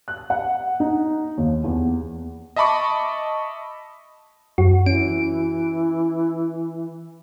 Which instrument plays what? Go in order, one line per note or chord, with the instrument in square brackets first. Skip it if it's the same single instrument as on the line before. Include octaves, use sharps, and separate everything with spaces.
[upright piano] F#6
F#5
D#4
D#2
E2
[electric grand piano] D#5 E5 A5 B5 C#6 D6
[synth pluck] F#2 F#4
[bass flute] E3 [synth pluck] C#4 D7